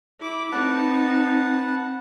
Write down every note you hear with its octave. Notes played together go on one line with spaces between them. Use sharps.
E4 D6
C4 D#4 B4 F#5 A5